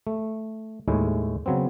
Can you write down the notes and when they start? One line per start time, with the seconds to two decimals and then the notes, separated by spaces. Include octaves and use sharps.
0.07 A3
0.88 D#2 A2 G#3 E4
1.46 C#3 F#3 B3 C4